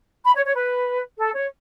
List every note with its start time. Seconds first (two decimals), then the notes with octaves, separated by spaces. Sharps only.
0.23 B5
0.34 C#5
0.45 C#5
0.55 B4
1.18 A4
1.35 C#5